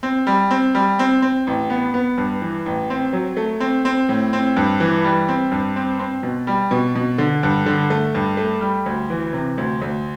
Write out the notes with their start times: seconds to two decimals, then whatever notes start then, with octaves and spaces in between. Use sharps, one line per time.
0.03 C4
0.27 G3
0.51 C4
0.75 G3
0.99 C4
1.22 C4
1.47 A1
1.70 B3
1.94 B3
2.18 G2
2.42 E3
2.66 A1
2.90 C4
3.13 F#3
3.37 A3
3.60 C4
3.85 C4
4.09 A2
4.33 C4
4.56 G2
4.80 E3
5.04 G3
5.28 C4
5.52 G2
5.76 C4
5.99 C4
6.23 B2
6.47 G3
6.71 B2
6.95 B2
7.18 D3
7.43 G2
7.66 D3
7.90 A3
8.15 G2
8.37 A3
8.61 G3
8.86 D2
9.10 E3
9.33 C3
9.58 D2
9.81 D2